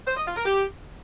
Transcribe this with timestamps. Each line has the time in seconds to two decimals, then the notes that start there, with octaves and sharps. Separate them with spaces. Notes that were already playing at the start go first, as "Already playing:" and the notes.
0.07 C5
0.17 D#5
0.26 F4
0.36 A#4
0.45 G4